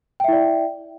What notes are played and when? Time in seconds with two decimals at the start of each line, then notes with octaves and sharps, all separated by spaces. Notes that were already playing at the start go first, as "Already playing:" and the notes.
0.20 G5
0.24 E5
0.28 E4
0.33 D5